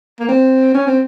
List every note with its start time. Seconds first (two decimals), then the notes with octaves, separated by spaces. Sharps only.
0.20 A#3
0.28 C4
0.74 C#4
0.87 C4